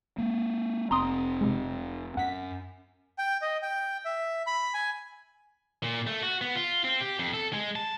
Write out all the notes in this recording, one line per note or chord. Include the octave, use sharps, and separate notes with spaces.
G#3 A#3
F1 C4 A#5 C6 D#6
C3 G3 G#3
F#2 F#5 B6
G5
D#5
G5
E5
B5
G#5
A#2
A3
F#4
B3
F4
C4
G4
F2
A4
G#3
A5